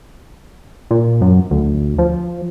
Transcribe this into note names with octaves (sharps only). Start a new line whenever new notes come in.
A#2
F#2
D2
F3